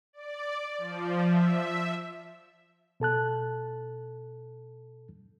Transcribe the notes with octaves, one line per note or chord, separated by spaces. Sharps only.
D5
F3
E5
B2 A4 A5 F#6